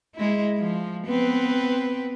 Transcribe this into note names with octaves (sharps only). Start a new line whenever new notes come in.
G#3 E4
F3
B3 C4 B4